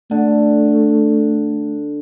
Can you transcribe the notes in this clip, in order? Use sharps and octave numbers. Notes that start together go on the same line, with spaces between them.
D3 A3